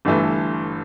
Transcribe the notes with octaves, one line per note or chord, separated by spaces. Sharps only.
G1 G2 E3 A3